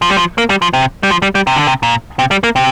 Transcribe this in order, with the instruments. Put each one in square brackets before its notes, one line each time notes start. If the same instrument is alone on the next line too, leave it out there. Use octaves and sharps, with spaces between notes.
[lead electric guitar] F3
G3
F3
A#3
G3
F3
C3
G3
F3
G3
G3
C3
D3
C3
A#2
C3
G3
A#3
C3